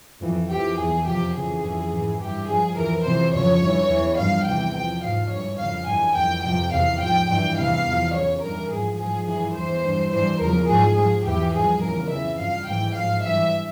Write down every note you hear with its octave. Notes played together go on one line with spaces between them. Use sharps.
F2 E3
F2 E3 G4
E2 E3 G#4
F2 C3 F3 G4
F2 C#3 E3 G#4
F2 C#3 E3
G#2 E3
G2 E3 G4
G2 F3 G#4
F2 E3 A#4
F2 C3 E3 C5
F2 C#3 F3 C#5
G2 E3
E2 E3
G2 F3 F5
E2 C3 E3 G5
E2 C3 F3 G5
G#2 F3 F5
G2 E3 C#5
F2 C#3 F3 F5
G2 E3 G#5
F2 E3 G5
F2 C3 F3 G5
E2 C3 E3 F5
G#2 F3 G5
G2 E3 G5
E2 C3 E3 F5
E2 C3 F3
F2 C#3 F3 C#5
G2 E3 A#4
G#2 F3 G#4
G#2 F3 G#4
G2 E3 G#4
E2 E3 C5
G2 E3
G2 E3 C5
E2 C#3 F3 A#4
G#2 F3 G#4
G#2 F3 G#4
E2 E3 G4
G2 F3 G#4
E2 C#3 E3 A#4
F2 C#3 E3 E5
G2 F3 F5
G#2 E3 G5
G#2 F3 F5
G2 E3 E5